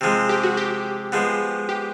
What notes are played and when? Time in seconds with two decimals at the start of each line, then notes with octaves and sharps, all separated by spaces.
0.01 C3 F3 G#3
0.29 G4
0.43 F#4
0.57 G4
1.12 F3 G#3 B3
1.69 G4